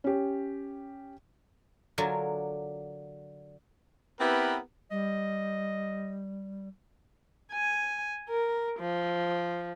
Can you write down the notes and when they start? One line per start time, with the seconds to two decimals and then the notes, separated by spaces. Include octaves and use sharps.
0.04 C#4 G4
1.98 D3 F#3 D4 F4 A#4 G#5
4.20 B3 C4 E4 G4 A#4 B4
4.91 G3 D#5
7.52 G#5
8.30 A#4
8.80 F3